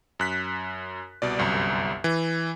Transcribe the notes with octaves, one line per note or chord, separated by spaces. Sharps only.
F#2 F#6 B6
C2 B2 D5
G1 C2 F#2
E3